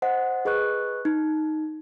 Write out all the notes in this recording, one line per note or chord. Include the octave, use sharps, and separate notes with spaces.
C5 D#5 F#5
G#4 B4 D#5 C#6 F#6
D#4